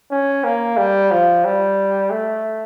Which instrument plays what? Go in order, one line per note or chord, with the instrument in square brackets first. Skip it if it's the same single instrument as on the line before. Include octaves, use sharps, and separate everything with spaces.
[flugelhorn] C#4
A#3
G3
F3
G3
A3